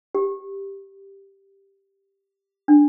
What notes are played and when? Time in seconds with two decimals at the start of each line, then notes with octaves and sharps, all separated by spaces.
0.15 G4
2.68 D4